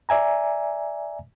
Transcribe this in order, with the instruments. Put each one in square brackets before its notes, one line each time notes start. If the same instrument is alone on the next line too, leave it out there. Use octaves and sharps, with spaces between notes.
[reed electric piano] D5 E5 G#5 A#5